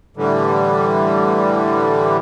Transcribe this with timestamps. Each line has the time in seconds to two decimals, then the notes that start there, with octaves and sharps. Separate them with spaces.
0.17 A2 D3 E3 G3